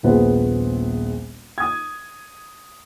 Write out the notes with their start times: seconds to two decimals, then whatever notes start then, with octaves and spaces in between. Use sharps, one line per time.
0.03 D#1 A#1 B3 G#4 C5
1.58 D#6 G#6